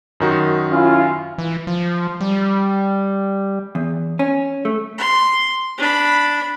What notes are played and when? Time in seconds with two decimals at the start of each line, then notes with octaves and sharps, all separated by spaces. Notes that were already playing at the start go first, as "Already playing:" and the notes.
0.20 F#2 D#3 F#4
0.71 C#4 E4 F4
1.38 E3
1.67 F3
2.21 G3
3.75 E2
4.19 C#4
4.65 A3
4.98 C6
5.78 D4 B5